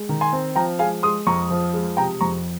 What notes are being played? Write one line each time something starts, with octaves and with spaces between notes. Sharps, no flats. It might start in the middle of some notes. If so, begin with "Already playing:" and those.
Already playing: G#3
D#3
G#5 C6
C4
F3 G5 A#5
G#3 F5 G#5
G#3 C6 D#6
F2 A#5 C#6
F3
G#3
C3 G5 A#5
F2 A#5 C#6